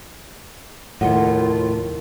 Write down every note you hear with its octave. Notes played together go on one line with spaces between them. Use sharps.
F1 D#2 A2 F4 F#5 C#7